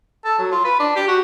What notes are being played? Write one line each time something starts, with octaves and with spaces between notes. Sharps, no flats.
A4
F#3
F4
B4
D4
G4
F#4